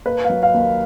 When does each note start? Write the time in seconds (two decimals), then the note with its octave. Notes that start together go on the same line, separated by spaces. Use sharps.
0.06 A#3 B4
0.24 F5
0.30 F#3
0.43 F5
0.54 D#2